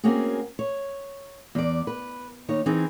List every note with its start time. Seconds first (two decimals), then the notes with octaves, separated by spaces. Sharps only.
0.04 A#3 C4 C#4 F#4 G#4
0.59 C#5
1.55 E2 D5
1.87 B4
2.49 D#2 D#4 C#5
2.66 E3 C4 D#4 G#4